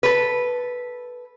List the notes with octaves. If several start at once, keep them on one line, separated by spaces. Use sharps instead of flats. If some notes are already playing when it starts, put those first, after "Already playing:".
A4 B4